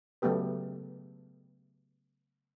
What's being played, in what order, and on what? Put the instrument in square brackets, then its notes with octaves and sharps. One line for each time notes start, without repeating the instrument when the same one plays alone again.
[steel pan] C#3 F#3 A3 B3 G4 B4